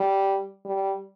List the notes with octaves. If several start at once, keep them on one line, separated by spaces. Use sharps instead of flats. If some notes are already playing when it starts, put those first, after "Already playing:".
Already playing: G3
G3